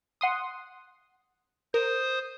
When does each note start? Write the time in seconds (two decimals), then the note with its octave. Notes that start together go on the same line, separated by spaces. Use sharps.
0.21 F#5 C6 D#6
1.74 A#4 C5 D#6